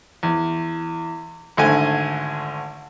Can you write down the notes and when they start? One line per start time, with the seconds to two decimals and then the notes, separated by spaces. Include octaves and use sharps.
0.23 E2
1.57 G#1 D3 A3 G#5